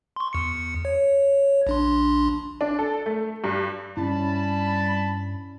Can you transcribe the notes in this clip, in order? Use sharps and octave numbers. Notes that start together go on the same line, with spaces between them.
C6 C#6
E2 C#7
C#5
A#1 D4 C6
D4
A4
A3
G2
G2 G3 C#4 E4 A5 B5